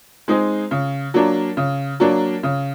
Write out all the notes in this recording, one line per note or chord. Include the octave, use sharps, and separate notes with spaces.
G#3 C4 D#4 G#4
C#3
F#3 A#3 D4
C#3
F#3 A#3 D4
C#3